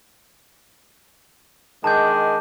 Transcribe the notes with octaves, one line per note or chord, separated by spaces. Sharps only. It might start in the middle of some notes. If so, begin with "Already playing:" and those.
D#3 G#3 D4 A5 G6